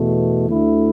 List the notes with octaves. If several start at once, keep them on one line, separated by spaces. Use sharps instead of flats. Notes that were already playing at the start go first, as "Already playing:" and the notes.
Already playing: E2 B2 A3
D2 D3 A3 E4